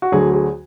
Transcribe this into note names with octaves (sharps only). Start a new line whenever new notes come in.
F#4
D2 D3 F#3 G#4
G#4